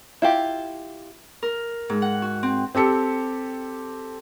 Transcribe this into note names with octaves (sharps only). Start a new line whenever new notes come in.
E4 F4 G4
A#4
G#2
F#5
F#4
C4
C4 G4 A4 C#7